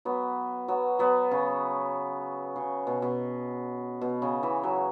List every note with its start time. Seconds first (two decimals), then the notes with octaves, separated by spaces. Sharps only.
0.05 F#3 B3
0.68 F#3 B3
0.99 F#3 B3
1.31 C#3
2.56 C#3
2.87 B2
3.02 B2
4.01 B2
4.22 C#3
4.43 E3
4.63 F#3